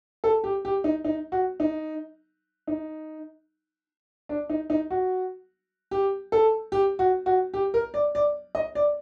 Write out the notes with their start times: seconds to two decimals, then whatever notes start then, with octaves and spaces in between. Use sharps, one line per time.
0.24 A4
0.44 G4
0.65 G4
0.84 D#4
1.05 D#4
1.32 F#4
1.60 D#4
2.67 D#4
4.29 D4
4.50 D#4
4.70 D#4
4.91 F#4
5.91 G4
6.32 A4
6.72 G4
6.99 F#4
7.26 F#4
7.54 G4
7.74 A#4
7.94 D5
8.15 D5
8.55 D#5
8.75 D5